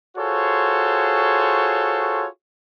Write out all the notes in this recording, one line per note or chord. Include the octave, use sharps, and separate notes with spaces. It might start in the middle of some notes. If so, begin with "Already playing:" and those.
F4 F#4 G#4 A4 C5 C#5